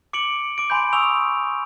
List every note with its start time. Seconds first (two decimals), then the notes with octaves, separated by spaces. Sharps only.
0.13 D6 C#7 D7 F#7
0.58 D6 D7
0.70 G#5 B5 C6 G6
0.93 G#5 C#6 D#6 E6 F7